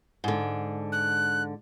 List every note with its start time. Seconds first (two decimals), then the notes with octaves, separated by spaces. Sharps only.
0.24 G#2 D3
0.92 F#6